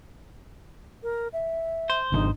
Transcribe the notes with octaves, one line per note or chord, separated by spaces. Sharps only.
A#4
E5
C5
G#1 D#3 D4 D#4